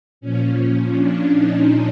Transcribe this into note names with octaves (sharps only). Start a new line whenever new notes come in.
A#2 F3 C#4
D4
D#4